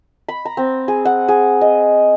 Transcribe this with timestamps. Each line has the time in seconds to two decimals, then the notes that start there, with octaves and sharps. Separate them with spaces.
0.28 B5
0.45 A#5
0.57 C4
0.88 G#4
1.05 F#5
1.28 G#4
1.61 D#5